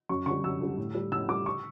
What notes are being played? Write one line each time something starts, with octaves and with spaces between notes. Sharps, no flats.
F#2 C#6
D3 G3 C#6
F#2 E6
D3 G3
A2
G3
A2 E6
G3 D6
C#6